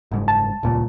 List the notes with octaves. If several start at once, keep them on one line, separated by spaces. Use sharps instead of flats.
F#1 G#2
A5
D#1 C#2 A#2